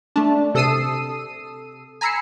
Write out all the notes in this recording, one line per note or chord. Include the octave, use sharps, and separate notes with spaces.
A3 D4
C3 A4 D#6 E6 C7 D#7
G#5 A#5 B5 E6 C7 C#7